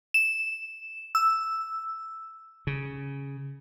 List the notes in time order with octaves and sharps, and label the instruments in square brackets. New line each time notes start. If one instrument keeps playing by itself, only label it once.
[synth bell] E7
E6
[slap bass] C#3